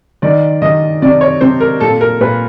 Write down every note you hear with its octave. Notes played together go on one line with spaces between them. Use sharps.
D#3 D5
D#3 D#5
C3 D5
C#5
C3 C5
A#4
A#2 A4
A#4
A#2 B4